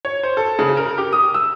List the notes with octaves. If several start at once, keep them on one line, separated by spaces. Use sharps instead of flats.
C#5
C5
A4
C#3
A#4
G4
D#6
E6